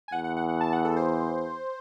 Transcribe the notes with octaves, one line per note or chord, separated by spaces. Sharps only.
G#5
E2 F#5
F#5
F#5
F#5
A5
F#5
A4
C5